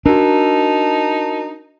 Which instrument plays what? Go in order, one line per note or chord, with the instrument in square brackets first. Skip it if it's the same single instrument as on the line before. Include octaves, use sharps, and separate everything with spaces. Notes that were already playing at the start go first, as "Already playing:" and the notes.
[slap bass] D4 [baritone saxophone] D#4 [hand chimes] F#4 A#4 [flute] A5